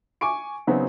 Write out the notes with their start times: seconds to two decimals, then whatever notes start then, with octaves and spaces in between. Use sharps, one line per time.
0.21 G#5 C#6 D6 D7
0.67 C#3 F#3 B3 C4 D#4 F#4